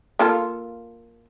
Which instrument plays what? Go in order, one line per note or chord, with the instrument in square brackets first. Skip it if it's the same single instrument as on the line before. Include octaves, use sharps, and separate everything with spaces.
[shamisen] A#3 F4 A4